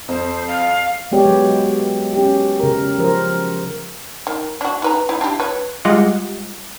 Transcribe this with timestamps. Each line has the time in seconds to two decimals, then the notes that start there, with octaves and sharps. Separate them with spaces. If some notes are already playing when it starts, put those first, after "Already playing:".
0.08 F2 C5
0.47 F5
1.12 G#3 B3 G4 C#5 D5
1.26 F#3
2.13 C#4 G4
2.60 C#3 A#4
2.98 F3 A#4 C5
4.27 D#3
4.61 D4 F#4
4.82 D#4 B4 A#5
5.09 D#4 E4
5.21 D4 E4 G4
5.40 B4 C#5
5.85 G3 G#3 F4 G4 D#5 F#5